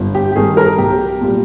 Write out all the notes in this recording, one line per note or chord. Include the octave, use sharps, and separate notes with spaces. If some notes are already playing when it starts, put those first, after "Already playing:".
Already playing: G1
G4
G4
G2 D#3 G3 G#4
A#4
B1 G4
A#2 G3